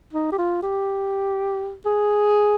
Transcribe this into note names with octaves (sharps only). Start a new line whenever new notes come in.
D#4
G4
F4
G4
G#4